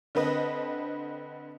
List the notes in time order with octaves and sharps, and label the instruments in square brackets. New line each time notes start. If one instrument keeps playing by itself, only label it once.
[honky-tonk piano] D3 C4 B4 D#5